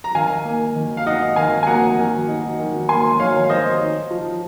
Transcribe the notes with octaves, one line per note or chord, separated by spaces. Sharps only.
A#5
D#3 F5 G#5
A#3
D#3
F5
D#4 D#5 F#5
D#3 F5 G#5
G#5
A#3 F#5 A#5
D#3
D#4
D#3
A#3 G#5 C6
D#3 C#5 F5
F5
D#4 C5 D#5
D#4
F3